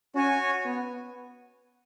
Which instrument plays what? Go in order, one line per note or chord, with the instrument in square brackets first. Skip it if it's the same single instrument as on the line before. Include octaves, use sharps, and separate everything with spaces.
[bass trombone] C#4 [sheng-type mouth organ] F#4 C#5 G#5
[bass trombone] B3